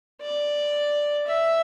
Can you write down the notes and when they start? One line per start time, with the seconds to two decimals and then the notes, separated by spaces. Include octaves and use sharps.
0.22 D5
1.26 E5